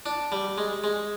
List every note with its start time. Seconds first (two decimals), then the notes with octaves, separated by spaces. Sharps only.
0.06 D4
0.32 G3
0.58 G#3
0.84 G#3